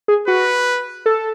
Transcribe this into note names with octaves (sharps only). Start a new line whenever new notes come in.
G#4
F#4 B4
A4